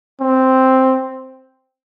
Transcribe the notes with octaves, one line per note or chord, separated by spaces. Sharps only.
C4